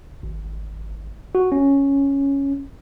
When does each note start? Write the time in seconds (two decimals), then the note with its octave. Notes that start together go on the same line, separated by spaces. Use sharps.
0.23 G#1
1.35 F#4
1.52 C#4